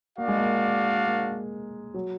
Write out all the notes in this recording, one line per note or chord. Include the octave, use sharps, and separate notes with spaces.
A#3 D4 F#4 D5 F5
G#3
A#3
A#3
F#3